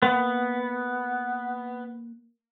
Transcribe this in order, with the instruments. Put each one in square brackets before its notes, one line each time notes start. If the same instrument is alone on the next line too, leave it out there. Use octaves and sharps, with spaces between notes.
[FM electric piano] A#3 [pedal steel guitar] B3